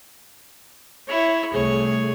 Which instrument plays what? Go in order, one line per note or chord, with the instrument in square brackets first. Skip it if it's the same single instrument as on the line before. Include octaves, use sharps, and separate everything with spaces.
[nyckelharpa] E4 C#5
[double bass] C2 A3 [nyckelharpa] G#4 C#5